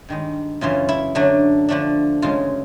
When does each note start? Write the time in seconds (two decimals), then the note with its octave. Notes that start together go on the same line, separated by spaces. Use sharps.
0.09 G2 D#3 G#3
0.61 F#2 C#3 E3 F4
0.89 E4
1.15 D3 F#3 A3 D4
1.68 D3 F3 A3 D4
2.22 F#2 C#3 E3 G#3 F4